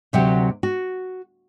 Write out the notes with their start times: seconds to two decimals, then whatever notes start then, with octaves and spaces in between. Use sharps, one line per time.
0.13 D2 C3 F#3 G4
0.63 F#4